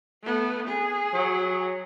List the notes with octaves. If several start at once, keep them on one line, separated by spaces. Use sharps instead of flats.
A3 B3
G#4
F#3